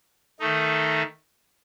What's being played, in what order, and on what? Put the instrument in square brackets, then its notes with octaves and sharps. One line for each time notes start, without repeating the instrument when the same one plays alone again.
[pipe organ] D#3 A3 D#4